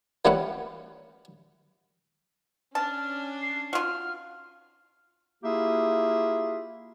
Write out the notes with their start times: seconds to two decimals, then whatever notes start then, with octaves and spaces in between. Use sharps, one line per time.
0.25 E3 G3 A#3 C#4 E4 F#5
2.75 C#4 D4 A5 F6
3.42 C7
3.73 F4 F#4 F6
5.43 A#3 E4 F4 G4 G#4 E5